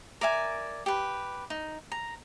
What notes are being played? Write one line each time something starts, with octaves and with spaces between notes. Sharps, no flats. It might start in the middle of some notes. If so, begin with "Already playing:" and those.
A#4 D5 E5 G#5
G4 B4
D#4
A#5